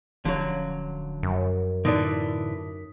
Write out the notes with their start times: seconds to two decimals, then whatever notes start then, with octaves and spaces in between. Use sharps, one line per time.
0.25 D1 D3 F3 F#3 C#4
1.23 F#2
1.85 A2 D3 E3 D4 D#4 D#6 B6